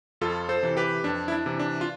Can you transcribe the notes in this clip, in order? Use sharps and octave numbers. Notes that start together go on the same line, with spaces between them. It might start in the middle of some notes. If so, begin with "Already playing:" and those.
F2 F4 A4
A4 C5
C3 E3
G4 B4
F2 D4
E4
D4
C3 E3
D4
F4